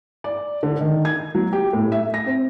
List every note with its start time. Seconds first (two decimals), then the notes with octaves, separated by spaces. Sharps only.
0.24 D5
0.63 D3
0.81 D#3
1.05 G#6
1.35 F#3
1.53 G4
1.73 A2
1.92 E5
2.14 A#6
2.26 C4